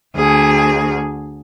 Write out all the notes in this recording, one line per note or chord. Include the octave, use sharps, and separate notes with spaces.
D2 G#4